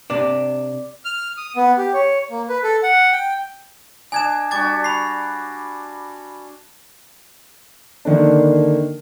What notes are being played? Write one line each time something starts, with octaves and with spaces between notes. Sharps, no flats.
C3 D4 D5
F6
D#6
B3
G4
C#5
A#3
B4
A4
F#5
G5
D4 D#5 G#5 G#6 E7
G3 D4 F#4 D6 G#6 A6
B5 C7
D3 D#3 A#3 D4